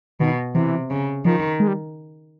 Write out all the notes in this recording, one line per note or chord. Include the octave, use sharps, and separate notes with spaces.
B2 D#3
C3 E3
C#3
D#3 F3
G#3
G3